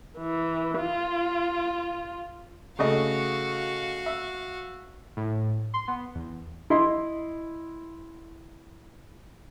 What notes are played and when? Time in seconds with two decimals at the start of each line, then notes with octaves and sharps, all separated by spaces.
0.18 E3
0.79 F4
2.79 C#3 A3 F#4 D#5 F5
4.06 E5
5.17 A2
5.74 C6
5.88 B3
6.15 E2
6.70 E4 D#5 C6